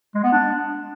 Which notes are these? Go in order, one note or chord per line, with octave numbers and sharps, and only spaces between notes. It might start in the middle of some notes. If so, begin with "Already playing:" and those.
G#3
B3
D4